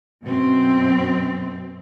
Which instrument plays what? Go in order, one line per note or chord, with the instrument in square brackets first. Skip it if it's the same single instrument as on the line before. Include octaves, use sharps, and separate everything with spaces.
[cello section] F#2 B2 C4